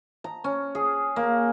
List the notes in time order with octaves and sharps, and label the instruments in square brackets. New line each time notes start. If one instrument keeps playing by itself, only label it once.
[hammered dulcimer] A#5
C#4
G#4
A#3